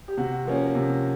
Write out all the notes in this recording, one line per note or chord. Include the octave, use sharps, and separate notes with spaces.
G4
C3 F#4
F3 A#3 C#4
C3